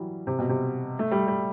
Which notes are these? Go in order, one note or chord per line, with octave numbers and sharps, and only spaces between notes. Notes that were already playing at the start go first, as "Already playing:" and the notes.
Already playing: E3 F#3 G3
C3
B2
C3
A3
G3
G3